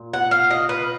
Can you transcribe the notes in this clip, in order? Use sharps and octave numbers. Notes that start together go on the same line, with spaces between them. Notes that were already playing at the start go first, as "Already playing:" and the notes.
Already playing: A#2
F#5
F5
D#5
B4